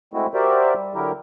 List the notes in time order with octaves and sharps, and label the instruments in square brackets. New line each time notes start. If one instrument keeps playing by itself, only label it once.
[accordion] G#3 A3 C4 E4 F#4
F#4 G4 A#4 C5 D5 E5
G3
D3 F#3 E4 G4 A#4